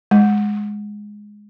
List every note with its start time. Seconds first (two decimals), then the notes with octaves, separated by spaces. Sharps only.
0.11 G#3